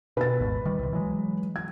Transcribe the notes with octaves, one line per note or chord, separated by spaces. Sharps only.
B2 B4 A6
G#1 D#2 G#2
D#3 G3
C2 C3
E3 F#3 G#3
G#6